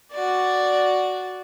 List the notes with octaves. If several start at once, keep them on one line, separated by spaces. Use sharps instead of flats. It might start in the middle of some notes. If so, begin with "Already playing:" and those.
F#4 D5